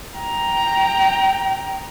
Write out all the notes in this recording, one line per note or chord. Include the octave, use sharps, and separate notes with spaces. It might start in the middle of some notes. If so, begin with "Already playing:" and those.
G5 A#5